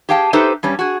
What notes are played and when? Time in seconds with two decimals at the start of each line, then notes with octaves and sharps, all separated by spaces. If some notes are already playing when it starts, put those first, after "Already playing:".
0.09 G4 G#4 F5 G5 A5
0.33 D#4 G4 A4 B4 C5 E5
0.63 G2 G3 C#4
0.79 F#4 G#4